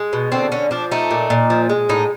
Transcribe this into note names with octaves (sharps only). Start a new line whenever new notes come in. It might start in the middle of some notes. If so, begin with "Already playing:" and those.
Already playing: G#3
B2
D3 C4
D3 C#4
F3 D4
A3 D#4
A#2
A#2
F3
G#3
A2 D#4